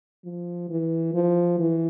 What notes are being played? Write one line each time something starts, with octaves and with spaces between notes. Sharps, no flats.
F3
E3
F3
E3